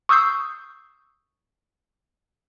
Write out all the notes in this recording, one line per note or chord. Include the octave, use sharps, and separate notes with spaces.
C#6 D#6 E6 G6 C7